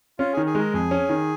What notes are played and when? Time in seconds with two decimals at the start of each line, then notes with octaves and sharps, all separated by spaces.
0.19 C#4 F4
0.33 G#4
0.37 D#3
0.46 G#4
0.55 G#3 A#4
0.74 F2 G#4
0.91 C#4
1.09 D#3